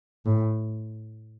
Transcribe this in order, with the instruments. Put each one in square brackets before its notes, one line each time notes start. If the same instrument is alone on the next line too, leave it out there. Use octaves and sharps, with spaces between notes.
[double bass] A2